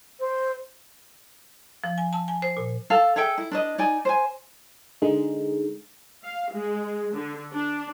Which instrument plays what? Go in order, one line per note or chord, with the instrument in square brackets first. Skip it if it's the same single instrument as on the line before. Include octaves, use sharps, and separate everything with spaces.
[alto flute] C5
[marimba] F3
G#5
A5
G#5
C5
A#2
[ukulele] A4 F5 A5
G#4 A4 E5 G5
E4
D4 B4 D#5
D#4 D5 G#5
C5 G#5
[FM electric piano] D3 G#3 D#4
[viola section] F5
G#3
D3
D4